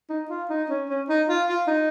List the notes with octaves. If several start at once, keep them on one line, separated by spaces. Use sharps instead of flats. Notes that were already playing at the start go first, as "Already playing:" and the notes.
D#4
F4
D#4
C#4
C#4
D#4
F4
F4
D#4